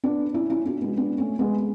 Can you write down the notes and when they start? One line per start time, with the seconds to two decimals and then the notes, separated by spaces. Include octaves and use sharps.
0.04 B3 D4
0.34 C#4 E4
0.50 C#4 E4
0.65 D4 F#4
0.81 G#3 B3
0.97 B3 D4
1.18 A3 C#4
1.39 G#3 B3